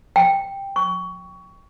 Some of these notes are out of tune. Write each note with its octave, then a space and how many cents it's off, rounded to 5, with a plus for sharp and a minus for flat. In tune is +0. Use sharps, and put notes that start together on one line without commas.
G5 +5
C#6 +20